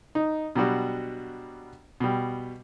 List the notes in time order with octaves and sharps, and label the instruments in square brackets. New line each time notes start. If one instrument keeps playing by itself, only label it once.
[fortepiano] D#4
B2 F#3 G3 D4 F#4 G4
B2 G3